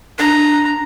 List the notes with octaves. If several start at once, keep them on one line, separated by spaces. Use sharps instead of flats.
D4 A#5